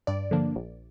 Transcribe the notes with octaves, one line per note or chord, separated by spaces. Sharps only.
G2 D5
D3 F3 A#3 D4
A#1